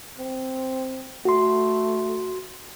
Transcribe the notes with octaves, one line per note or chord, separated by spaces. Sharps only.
C4
A3 F#4 C6